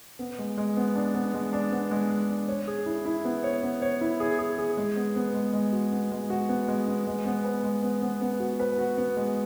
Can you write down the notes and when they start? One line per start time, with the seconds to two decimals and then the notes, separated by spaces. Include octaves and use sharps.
0.19 B3
0.39 G#3
0.58 G#3
0.77 B3
0.96 D4
1.14 B3
1.34 G#3
1.53 D4
1.72 B3
1.91 G#3
2.10 G#3
2.29 D4
2.48 C#5
2.67 G#4
2.86 E4
3.05 E4
3.25 B3
3.44 C#5
3.63 B3
3.82 C#5
4.01 E4
4.20 G#4
4.39 G#4
4.58 G#4
4.77 G#3
4.96 B3
5.16 B3
5.34 G#3
5.53 G#3
5.73 F#4
5.92 B3
6.11 G#3
6.30 F#4
6.49 B3
6.68 G#3
6.88 B3
7.07 G#3
7.26 B3
7.44 B4
7.64 G#3
7.83 B3
8.02 B3
8.21 B3
8.40 F#4
8.60 B4
8.78 F#4
8.97 B3
9.17 G#3